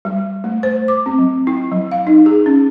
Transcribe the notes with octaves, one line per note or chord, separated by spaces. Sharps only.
G3
A3
C5
D6
C4
F#3
E4
F#3
F5
D#4
G#4
C#4